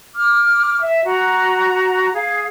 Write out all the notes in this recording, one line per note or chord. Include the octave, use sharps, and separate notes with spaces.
D6 F6
E5
F#4 A#5
G#4 F5